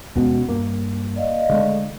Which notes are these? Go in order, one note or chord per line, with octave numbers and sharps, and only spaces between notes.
D#2 B2 G#3 B3 C#4 F#4
G2 A#3
D5 D#5 F5
D3 G#3 A3